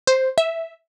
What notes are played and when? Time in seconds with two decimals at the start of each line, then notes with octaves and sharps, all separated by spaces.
0.07 C5
0.38 E5